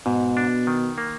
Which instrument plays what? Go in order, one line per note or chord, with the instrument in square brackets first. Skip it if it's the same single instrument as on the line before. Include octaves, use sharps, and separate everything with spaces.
[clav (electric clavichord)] G#2 [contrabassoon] B2
[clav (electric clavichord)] D4
D#3
A#3